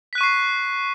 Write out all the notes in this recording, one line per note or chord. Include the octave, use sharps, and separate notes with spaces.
C#6 F#6 B6 C7 D#7